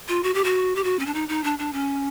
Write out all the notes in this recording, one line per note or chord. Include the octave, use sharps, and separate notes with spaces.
F4
F#4
G4
F#4
G4
F#4
C#4
D4
D#4
D#4
D4
D4
C#4